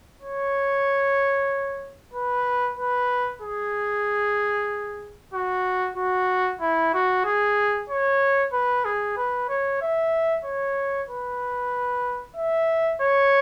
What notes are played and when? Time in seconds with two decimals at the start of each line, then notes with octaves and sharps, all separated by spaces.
0.22 C#5
2.13 B4
2.77 B4
3.42 G#4
5.34 F#4
5.97 F#4
6.61 E4
6.94 F#4
7.25 G#4
7.90 C#5
8.53 B4
8.85 G#4
9.17 B4
9.49 C#5
9.81 E5
10.45 C#5
11.09 B4
12.37 E5
13.01 C#5